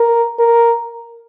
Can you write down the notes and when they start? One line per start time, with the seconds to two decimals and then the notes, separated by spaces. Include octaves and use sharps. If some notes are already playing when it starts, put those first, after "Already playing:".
Already playing: A#4
0.40 A#4